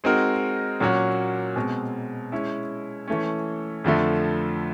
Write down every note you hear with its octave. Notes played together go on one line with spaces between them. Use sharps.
G#3 C4 D#4 F#4 A#4
A#2 F#3 A#3 C#4 F#4
B2 G#3 C4
G#3 C#4 E4
E3 A3 C#4
F2 D3 F3 A3